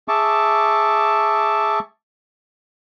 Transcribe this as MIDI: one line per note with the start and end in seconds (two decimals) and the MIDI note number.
0.08 1.79 68
0.08 1.79 76
0.08 1.79 81
0.08 1.79 85
0.08 1.79 86